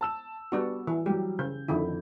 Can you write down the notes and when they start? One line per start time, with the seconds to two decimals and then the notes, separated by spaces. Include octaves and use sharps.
0.01 A5 E6 E7
0.52 G3 B3 D4 F#4
0.87 E3
1.06 F#3 G3 G4
1.39 C#3 G6
1.68 F2 D3 D#3 E4